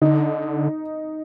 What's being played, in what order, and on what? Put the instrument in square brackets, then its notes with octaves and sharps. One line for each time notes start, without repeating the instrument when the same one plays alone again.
[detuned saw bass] D3 [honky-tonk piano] D#4